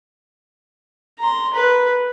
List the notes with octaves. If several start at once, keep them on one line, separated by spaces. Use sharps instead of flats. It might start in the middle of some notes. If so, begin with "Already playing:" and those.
A#5 C6
B4